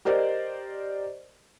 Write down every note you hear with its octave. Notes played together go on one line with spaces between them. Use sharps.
G4 A#4 C5 D5 D#5